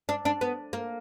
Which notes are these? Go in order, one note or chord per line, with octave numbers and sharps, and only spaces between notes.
D4
D4
B3
A#3